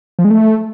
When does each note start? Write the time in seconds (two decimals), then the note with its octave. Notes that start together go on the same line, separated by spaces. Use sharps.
0.19 F3
0.25 G#3
0.30 A3